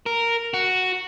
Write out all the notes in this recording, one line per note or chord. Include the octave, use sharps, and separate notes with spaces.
A#4
F#4